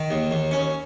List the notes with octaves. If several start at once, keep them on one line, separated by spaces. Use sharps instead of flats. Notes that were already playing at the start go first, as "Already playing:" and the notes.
Already playing: D#3
D#2
D#2
C#4